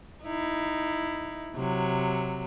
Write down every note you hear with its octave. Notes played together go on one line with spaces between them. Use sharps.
D#4 E4
C3 F#3